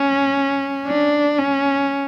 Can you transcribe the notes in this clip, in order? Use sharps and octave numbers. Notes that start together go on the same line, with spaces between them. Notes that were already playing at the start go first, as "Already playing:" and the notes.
Already playing: C#4
D4
C#4